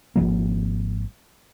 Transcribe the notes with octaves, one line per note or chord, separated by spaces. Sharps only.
G#1 F#2 F3 A#3